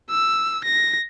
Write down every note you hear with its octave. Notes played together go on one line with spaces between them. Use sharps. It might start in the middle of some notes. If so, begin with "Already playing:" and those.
E6
A#6